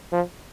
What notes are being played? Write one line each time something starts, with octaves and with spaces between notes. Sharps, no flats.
F3